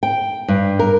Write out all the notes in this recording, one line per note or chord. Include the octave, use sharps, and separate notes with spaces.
G5
G2
A#4